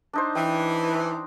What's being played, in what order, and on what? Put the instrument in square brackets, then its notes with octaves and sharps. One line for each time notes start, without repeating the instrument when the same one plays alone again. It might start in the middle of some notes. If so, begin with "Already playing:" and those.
[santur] D4 D#4 C5
[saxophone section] E3 [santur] G5